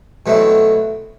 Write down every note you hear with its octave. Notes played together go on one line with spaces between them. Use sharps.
B2 F#3 A3 C4 E4